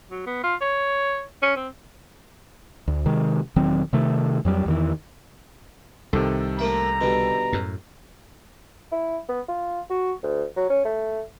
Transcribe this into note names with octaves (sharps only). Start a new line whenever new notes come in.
F#3
B3
F4
C#5
C#4
C4
D2
C3 D#3 G#3
E1 D#3 F#3 C4
C3 D#3 A3
F2 F#3 G3
E2 D#3 E3
C2 C3 D#3 A4
A3 A#3 E5 A#5
B2 D3 G3
F#2 A2
E4
B3
F4
F#4
D2
F#3
C#4
A3